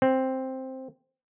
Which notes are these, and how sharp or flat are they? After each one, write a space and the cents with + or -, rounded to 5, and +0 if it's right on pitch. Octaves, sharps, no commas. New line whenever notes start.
C4 +5